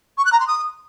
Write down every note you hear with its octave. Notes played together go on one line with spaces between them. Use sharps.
C#6
F#6
A#5
C6
D#6